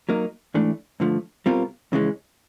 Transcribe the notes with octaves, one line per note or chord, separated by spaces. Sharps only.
F#3 A#3 D#4
G#2 E3 A3 D4
G2 D3 F3 A3
B2 G3 C4 F4 A#4
F2 C#3 E3 G#3 C#4